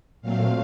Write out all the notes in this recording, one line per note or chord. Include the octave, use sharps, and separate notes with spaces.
A#2 F#3 A3 C4 F5